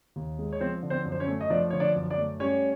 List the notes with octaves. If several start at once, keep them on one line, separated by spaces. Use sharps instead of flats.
D#2
G#3
C#5
F3 C4 C5
D3
C4 C5
F#2
C5
C#4 C#5
A3
D#5
F3 D4 D5
D3 C#5
D4 D5
F#2
D4 D5
A3
G3 C#4 C#5